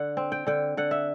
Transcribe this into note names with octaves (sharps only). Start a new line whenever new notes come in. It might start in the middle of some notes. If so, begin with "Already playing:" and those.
Already playing: D3 F#5
C4
G5
D3 G5
D3 F#5
E5